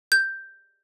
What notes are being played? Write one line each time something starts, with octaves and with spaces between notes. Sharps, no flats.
G6